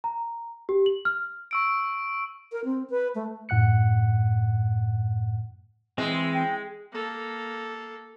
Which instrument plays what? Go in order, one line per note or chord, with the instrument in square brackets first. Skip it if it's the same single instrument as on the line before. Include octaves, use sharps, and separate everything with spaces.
[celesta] A#5
G4
F#7
F6
[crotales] C#6 E6 D7
[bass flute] A#4
C4
B4
A3
[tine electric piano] F#2 A2 F#5 F#6 C#7
[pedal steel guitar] E3 C4 [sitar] G#3
[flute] G5
[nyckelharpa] A#3 A4